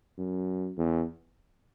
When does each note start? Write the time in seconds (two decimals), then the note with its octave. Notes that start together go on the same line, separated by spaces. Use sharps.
0.18 F#2
0.77 E2